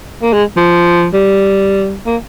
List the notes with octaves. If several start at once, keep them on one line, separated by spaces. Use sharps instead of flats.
A#3
G#3
F3
G3
A#3